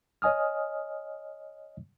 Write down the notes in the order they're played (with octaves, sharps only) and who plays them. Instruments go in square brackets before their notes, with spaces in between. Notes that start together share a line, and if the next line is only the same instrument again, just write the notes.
[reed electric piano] C#5 D#5 G#5 D#6 F6